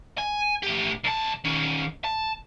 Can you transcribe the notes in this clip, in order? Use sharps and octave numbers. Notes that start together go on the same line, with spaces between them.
G#5
A2 G4
C2 A5
D#3 C#4
A5